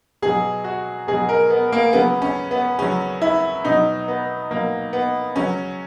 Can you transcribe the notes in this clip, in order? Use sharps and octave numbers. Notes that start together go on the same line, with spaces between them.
B2 F#3 G#4
F#4
B2 F#3 G#4
A#4
B3
A#3
C#3 F#3 B3
C#4
B3
C#3 F#3 C#4
E4
B2 F#3 D#4
B3
B2 F#3 A#3
B3
C#3 F#3 C#4